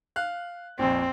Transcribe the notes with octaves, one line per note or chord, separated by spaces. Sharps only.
F5 F#6
A#1 F2 C4